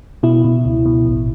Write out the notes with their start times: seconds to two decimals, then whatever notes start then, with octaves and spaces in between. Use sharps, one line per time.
0.23 B2 E4
0.44 B2
0.65 C#2
0.86 B2
1.06 A1